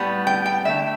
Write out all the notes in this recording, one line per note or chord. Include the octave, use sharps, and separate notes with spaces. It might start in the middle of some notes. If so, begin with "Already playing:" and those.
Already playing: A2 G3 B3
G5
G5
D3 A3 E5